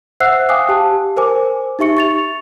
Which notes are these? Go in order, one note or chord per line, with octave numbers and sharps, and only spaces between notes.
C5 E5 F#5 E6 F#6 C7
F5 G5 G#5 D6 D#6 F#6
G4 A5
A#4 C5 G#5 D6
D#4 G4 E5 C#6 C#7
C#6 A6 F7